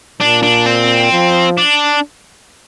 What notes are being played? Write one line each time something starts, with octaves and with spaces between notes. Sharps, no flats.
A#2 D4
D4
C4
F3
D4